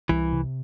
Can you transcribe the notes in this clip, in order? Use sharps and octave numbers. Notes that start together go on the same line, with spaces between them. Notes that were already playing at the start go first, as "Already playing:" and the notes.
C2 E3
C3